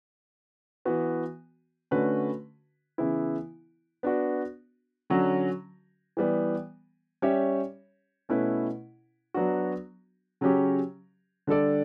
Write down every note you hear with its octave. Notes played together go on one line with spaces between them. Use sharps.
E3 B3 F#4
D3 A3 C#4 F#4 B4
C#3 E3 B3 E4
B3 D4 F#4
D3 F#3 C#4 F#4
E3 G3 B3
G3 C#4 G4 C#5 E5
B2 A3 C#4 E4 B4
F#3 B3 D4 F#4
C#3 F#3 C#4 G4
D3 G3 D4 A4 D5